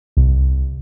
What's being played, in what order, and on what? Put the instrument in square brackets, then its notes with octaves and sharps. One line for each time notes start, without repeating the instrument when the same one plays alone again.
[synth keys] C2